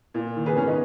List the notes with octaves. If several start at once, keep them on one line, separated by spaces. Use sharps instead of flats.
A#2
D#3
G#4 B4
G#1 C#4
B3 D#4